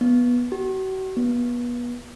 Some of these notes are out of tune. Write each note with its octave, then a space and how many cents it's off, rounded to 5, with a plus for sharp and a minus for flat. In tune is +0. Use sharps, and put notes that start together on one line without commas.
B3 -15
F#4 +40
B3 -30